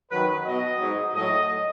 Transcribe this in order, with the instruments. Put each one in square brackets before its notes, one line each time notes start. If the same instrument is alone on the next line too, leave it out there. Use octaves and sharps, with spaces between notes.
[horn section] F#2 D#3 F#3 B4
B2 F#3 D#5
G#2 F#3
A2 F#3 D#5